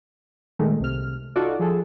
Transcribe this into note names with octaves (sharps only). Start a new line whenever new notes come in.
A#2 D#3 G#3 A3
C2 C3 F6
D#4 F4 F#4 A4 D5
F3 G#4 A4